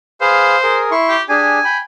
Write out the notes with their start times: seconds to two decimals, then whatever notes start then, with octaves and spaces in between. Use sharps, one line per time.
0.21 G#4 B4 C5 F5
0.63 G#4 A#4
0.91 E4 C6 C#6
1.09 G4
1.29 D4 G4 G#4 G#5
1.64 G5 B5